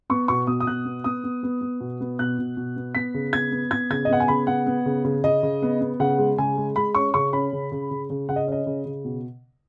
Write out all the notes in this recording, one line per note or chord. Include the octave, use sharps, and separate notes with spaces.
B3 C#6
B2 C#6
B2 D#6
D#6
B2 F#6
B3
B3 D#6
B3
B3
B3
B2
B3
B2 F#6
B2
B2
B3
B3 B6
C#3
B3 G#6
B3
B3 G#6
C#3 G#6
D#5
B3 F#5
G#5
C#3 B5
B3 F#5
B3
C#3
C#3
C#3 D#5
C#3
B3
B3
C#3 F#5
G#3
C#3 G#5
G#3
G#3 B5
C#4 C#6
C#3 C#6
C#4 B5
C#3
C#3
C#3
C#3
C#3 F#5
D#5
C#4 D#5
C#3
C#3
B2